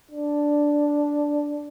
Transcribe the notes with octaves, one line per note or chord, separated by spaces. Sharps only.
D4